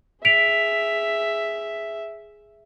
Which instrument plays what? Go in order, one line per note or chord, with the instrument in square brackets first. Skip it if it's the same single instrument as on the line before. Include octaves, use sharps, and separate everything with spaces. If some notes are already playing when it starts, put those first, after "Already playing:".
[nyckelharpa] G#4 E5 [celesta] B6 D7 F7